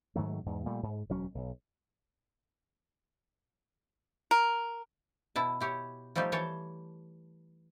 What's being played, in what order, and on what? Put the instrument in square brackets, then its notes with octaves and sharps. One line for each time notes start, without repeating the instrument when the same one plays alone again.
[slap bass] G#2 D#3 F#3 A3
E2 G#2
A#2 G3 A3
G#2
E1 D2 F#3 C#4
B1
[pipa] A#4
[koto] B2 E4 A5
E4 G4 C#5
F3 G3 A3 D#4 G4
E3 C#5 G5 A5